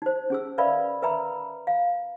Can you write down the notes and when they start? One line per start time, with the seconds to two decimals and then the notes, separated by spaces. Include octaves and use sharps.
0.02 D#4 C5
0.30 C#4 G#4 E6
0.58 A#4 B4 D5 E5 F5 B5
1.02 A#4 B4 E5 G5 A#5 B5
1.67 F5